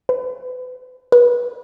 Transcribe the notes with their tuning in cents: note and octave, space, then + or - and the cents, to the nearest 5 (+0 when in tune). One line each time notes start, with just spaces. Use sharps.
B4 +35
B4 -25